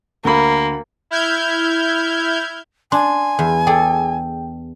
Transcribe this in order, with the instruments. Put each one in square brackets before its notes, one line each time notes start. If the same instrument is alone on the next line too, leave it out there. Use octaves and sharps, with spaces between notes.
[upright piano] D2 B5 [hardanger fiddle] A#3
[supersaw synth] E4 F6 G6 G#6
[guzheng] D4 [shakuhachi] G#5 [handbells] C6
[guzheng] E2
[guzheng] G#4 A4 D5 [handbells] G5